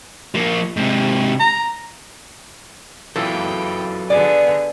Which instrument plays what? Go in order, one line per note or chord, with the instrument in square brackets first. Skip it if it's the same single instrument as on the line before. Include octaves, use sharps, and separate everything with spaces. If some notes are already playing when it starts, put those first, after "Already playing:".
[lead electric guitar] F3 A#3
G#2 C3
[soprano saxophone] A#5
[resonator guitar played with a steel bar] E3 [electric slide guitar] F#3 F4 A4 [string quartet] G5
[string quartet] D3 B3 G#4 [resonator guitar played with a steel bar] D5